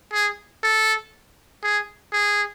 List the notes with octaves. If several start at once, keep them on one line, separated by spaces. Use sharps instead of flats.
G#4
A4
G#4
G#4